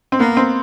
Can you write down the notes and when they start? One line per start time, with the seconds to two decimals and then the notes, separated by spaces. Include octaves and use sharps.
0.12 C4
0.19 A#3 B3
0.37 C4